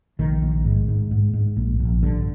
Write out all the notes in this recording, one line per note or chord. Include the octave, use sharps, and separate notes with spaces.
A#1 D#3
A#1
G#2
G#2
G#2
G#2
A#1
A#1
G2 D3